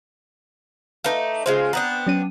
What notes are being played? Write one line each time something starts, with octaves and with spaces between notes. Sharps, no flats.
A3 D#4 B4 D5 F5
C#3 G#3 F4 C5
B3 C4 D4 A#5 D#6
F#3 C#4 D#7